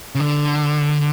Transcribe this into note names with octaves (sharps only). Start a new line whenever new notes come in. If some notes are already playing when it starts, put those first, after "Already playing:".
C#3
D3